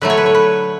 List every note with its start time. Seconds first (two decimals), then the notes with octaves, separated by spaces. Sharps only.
0.02 D3 F#3 A3 B4
0.10 C#5
0.18 B4
0.26 C#5
0.35 B4